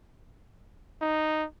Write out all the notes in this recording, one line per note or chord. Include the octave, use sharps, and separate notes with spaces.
D#4